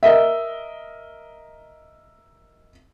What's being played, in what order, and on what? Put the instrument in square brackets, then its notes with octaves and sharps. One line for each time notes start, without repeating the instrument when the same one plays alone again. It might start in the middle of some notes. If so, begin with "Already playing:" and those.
[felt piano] A#4 D#5 E5